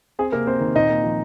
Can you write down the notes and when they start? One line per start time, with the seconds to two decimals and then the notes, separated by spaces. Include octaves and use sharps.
0.19 C4 G#4
0.32 C3 A#3 A#4
0.47 C4 C5
0.61 D#3
0.75 A#2 D#4 D#5
0.90 A#3
1.04 F3